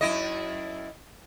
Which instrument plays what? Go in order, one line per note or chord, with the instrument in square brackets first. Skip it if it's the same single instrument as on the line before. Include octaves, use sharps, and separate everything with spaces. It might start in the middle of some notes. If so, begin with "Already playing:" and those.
[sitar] F#2 E4 D#5